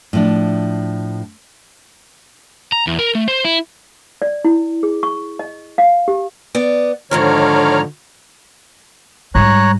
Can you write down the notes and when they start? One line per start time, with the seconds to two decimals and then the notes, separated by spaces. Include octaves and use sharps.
0.13 A2 F3 D4
2.72 A#5
2.87 E2
2.99 A#4
3.15 A3
3.28 C5
3.45 E4
4.22 D5
4.45 E4
4.83 G#4
5.03 C#6
5.39 D#5
5.78 F5
6.08 G4
6.55 B3 D5
7.11 G#2 D3 D#3 F3 C#5 A#5 F6
9.35 G#2 G3 C#5 A#5 F#6